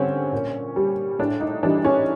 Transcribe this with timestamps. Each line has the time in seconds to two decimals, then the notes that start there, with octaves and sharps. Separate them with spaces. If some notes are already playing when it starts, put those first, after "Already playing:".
Already playing: D3 G3 C4 C#4
0.32 A#2
0.76 G3
1.19 A2 D4
1.40 D#4
1.63 E3 G3 D4
1.85 C#4